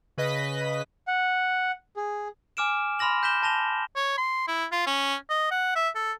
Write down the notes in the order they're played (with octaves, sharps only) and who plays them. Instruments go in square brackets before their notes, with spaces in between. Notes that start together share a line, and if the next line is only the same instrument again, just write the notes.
[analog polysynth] C#3 B4 D#5 B6
[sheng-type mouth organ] F#5
G#4
[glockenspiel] G#5 D6 F6 D7 E7
B5 C6 F6 A#6 F#7
G6 B6 E7 G7
A5 A#6 F7 G7
[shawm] C#5
C6
E4
F4
C#4
D#5
F#5
E5
A4